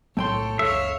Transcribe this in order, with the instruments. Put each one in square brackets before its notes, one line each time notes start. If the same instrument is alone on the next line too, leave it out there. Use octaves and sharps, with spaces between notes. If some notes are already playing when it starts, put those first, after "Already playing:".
[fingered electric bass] B1 A2 F#3 [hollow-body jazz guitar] A3 G5 C6 [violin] A4 C#5
[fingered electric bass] F#1 C#2 [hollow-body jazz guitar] A4 [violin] C#5 F5 [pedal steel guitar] E5